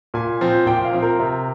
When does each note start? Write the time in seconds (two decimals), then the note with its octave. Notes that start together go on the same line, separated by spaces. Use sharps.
0.14 A#2 G#5
0.41 F3 C4
0.66 A#2 G5
0.85 F5
0.93 F3 C4
1.02 A#4
1.19 C3